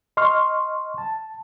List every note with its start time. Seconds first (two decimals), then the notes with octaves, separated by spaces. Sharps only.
0.17 D#5 C6 C#6 F6
0.98 A5